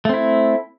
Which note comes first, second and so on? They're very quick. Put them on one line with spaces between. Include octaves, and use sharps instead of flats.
A3 C4 E4